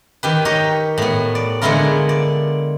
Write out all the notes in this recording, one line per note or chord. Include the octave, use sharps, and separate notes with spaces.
D#3 G4 B4
D#4 G4 C#5 D#5
A2 B3
D5
D3 G#3 B3 E4 F4 A#4
D5